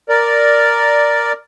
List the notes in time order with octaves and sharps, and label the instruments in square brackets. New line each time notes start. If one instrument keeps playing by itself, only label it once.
[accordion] A#4 D5